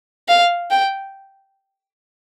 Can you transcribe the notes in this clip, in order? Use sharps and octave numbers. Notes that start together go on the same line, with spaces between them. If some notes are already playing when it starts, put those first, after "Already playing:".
F5
G5